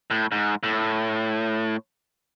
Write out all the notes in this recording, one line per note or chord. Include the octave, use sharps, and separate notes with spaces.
A2
G#2
A2